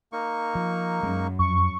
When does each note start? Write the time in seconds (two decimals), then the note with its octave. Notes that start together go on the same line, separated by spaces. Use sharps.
0.12 A#3 D#4 C#6
0.55 F3
1.03 F#2 G#3
1.39 F2 C#6